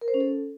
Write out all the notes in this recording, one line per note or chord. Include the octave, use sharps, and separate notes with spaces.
A#4
C5
C#4
A4